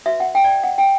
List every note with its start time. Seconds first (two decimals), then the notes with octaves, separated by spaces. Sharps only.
0.06 F#4 B4 E5
0.20 F#5
0.35 G5
0.44 D5
0.63 F#5
0.78 G5